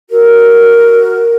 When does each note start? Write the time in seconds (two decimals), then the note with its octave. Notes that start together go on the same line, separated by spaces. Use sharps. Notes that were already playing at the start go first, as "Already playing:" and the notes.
0.11 F#4 A#4